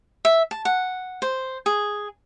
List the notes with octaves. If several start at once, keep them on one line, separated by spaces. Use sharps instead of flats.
E5
A5
F#5
C5
G#4